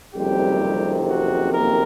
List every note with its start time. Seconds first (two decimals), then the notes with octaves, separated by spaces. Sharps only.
0.13 F#1 F2 C3 D#3 G3 G4
1.07 F#4
1.52 A#3 A#4